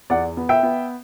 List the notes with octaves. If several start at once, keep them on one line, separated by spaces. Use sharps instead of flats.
E2 D5 F#5
B3
E5 G5
B3